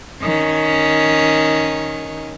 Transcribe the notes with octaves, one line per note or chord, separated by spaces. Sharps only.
D#3 C#4